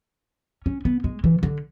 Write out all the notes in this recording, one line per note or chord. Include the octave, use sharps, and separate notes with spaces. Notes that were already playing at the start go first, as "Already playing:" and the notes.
C#4
B3
G#3
E3
D3